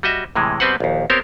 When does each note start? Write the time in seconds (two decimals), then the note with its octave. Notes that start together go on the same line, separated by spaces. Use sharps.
0.03 G3 F#4 D#5 E5
0.36 A2 C3 E3 G#3
0.60 B2 G3 C4 B4 C5 F#5
0.80 A#1 D#2
1.10 B3 C4 G4 A#4 C5 C#5